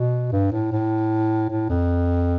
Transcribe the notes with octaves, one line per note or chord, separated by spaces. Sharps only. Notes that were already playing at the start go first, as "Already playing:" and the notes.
Already playing: B2
G2
A2
A2
A2
F2